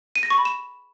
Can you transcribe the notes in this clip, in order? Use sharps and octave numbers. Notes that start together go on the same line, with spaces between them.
D#7
A#6
C#6
B5
E7